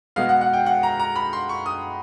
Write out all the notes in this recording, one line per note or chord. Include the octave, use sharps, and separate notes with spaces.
B2 G#3 B3 F5
F#5
F#5
G5
F#5
A#5
A#5
B5
C6
C#6
D#6